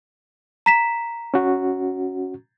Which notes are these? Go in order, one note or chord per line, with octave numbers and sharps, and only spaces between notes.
A#5 B6 E7
C#4 F#4